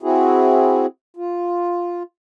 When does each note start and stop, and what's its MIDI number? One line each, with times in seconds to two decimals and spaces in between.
0.03 0.86 60
0.03 0.86 64
0.03 0.86 66
0.03 0.86 68
1.16 2.03 65